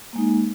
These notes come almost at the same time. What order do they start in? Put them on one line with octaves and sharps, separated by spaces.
A#3 G#3 D#4